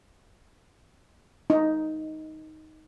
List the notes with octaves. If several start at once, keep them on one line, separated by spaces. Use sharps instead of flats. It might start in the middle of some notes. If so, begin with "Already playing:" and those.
D#4